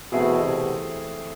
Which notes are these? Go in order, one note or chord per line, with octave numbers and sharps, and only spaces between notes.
B2 E3 A3 C4 E4 G#4
C3